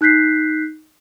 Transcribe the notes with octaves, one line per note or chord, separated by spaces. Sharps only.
D#4 F#6 G6 B6 C7